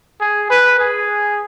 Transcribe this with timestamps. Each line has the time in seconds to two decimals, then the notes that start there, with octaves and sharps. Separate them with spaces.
0.21 G#4
0.50 B4
0.79 G#4